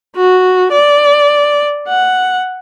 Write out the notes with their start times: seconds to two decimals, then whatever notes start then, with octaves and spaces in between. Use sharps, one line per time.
0.16 F#4
0.72 D5
1.89 F#5